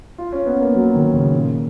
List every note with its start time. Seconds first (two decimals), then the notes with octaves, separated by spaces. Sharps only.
0.18 F4
0.32 C#4
0.46 B3
0.61 A#3
0.75 F#3
0.94 D#3
1.14 C#3
1.33 A#2